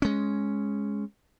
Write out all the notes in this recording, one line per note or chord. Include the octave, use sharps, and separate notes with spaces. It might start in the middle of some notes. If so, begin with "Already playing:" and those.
G#3 C#4